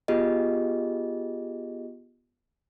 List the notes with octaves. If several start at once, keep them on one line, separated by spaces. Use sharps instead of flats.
B3 F4 G4 G#4 D#5